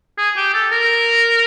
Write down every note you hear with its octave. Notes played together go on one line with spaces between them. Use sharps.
G#4
G4
A4
A#4